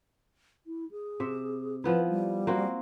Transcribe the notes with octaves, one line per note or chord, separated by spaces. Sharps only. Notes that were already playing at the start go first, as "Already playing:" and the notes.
E4
G#4
C3 E5
F3 B3 E4 B4
G3
A#3 C4 F#4